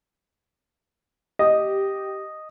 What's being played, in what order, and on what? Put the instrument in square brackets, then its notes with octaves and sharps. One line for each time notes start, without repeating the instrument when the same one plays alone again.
[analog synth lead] G4 [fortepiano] D#5